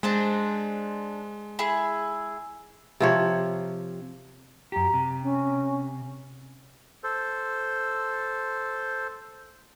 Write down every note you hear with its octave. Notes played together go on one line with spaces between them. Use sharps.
G#3 D4 C5 A#5
E4 G#4
C3 F3 C#5
F#2 G4 A#5
C3
C#4
A4 C5